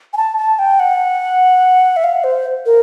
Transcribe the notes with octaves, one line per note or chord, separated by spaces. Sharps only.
G#5
A5
A5
G5
F#5
E5
F5
C5
A#4